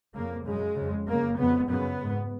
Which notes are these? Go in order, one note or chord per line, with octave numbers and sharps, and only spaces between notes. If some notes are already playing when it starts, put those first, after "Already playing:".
F2 C#3 A#3
F#2 C#3 G#3
F2 C#3
F#2 C#3 A#3
F2 C#3 B3
F#2 C#3 B3
G#2